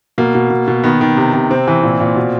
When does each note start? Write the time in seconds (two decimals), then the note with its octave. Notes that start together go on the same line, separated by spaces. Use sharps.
0.18 B2 A#3
0.35 B2
0.50 B2
0.68 B2
0.84 D#3 B3
1.01 D#3
1.17 C3
1.34 C3
1.50 C3 C4
1.68 E3
1.83 A#2
2.00 A#2
2.16 B2